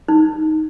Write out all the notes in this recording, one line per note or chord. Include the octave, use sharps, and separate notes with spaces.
D#4